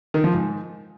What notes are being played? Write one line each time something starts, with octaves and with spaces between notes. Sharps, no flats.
D#3
F3
G#2